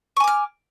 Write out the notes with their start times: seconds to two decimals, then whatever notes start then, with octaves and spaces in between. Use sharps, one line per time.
0.17 C#6
0.20 G#5
0.24 D6
0.28 F6